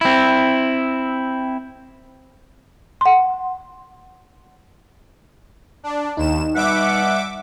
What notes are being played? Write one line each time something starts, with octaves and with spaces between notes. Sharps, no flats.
C4 E4
F#5 C6
D4
D#2 D#4 E7
B2 G3 E5 F#5 D6